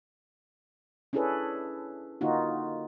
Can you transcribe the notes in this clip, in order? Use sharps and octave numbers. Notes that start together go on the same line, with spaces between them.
C#4 D4 E4 G#4 A4 B4
D3 A#3 D#4 F4 F#4